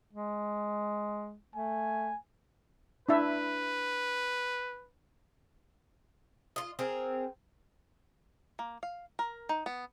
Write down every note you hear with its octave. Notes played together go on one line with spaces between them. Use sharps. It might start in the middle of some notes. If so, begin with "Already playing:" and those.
G#3
A3 G#5
D4 E4 B4 E5
F4 D#5
C4 G#4 A#4
A#3
F5
A#4
D#4
B3